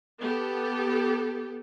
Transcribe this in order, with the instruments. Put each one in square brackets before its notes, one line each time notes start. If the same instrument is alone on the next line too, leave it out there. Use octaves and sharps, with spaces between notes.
[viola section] B3 G4 A4